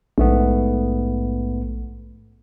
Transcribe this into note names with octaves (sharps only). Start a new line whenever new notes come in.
A#1 G#2 A3 B3